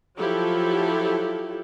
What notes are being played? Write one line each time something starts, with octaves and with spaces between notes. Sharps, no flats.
F3 F#3 E4 G4 A4